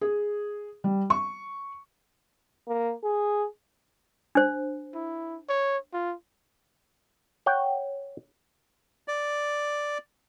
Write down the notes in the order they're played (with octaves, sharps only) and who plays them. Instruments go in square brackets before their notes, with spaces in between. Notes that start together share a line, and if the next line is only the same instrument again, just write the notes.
[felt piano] G#4
G3
C#6
[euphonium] A#3
G#4
[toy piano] D4 C5
[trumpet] E4
C#5
F4
[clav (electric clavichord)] C#5 F#5 G5
[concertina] D5